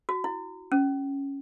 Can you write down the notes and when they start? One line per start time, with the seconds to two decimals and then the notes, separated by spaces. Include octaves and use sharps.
0.09 F#4
0.24 E4
0.72 C#4